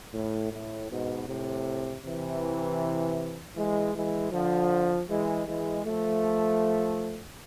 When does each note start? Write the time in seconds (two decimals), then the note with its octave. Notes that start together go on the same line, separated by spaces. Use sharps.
0.14 A2
0.51 A2
0.90 G#2 B2
1.27 A2 C3
2.03 C3 E3
3.56 E3 G#3
3.95 E3 G#3
4.32 D3 F3
5.08 E3 G#3
5.46 E3 G#3
5.84 F3 A3